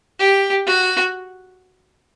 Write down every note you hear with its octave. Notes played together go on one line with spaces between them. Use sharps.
G4
F#4